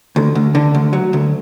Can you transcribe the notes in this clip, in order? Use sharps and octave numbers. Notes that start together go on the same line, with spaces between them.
D2
D2
D3
D2
F#3
D2